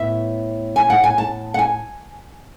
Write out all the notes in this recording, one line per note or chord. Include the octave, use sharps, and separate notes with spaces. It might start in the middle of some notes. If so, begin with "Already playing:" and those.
Already playing: A2 B3 E5
G#5
F#5
G#5
A5
F#5
G#5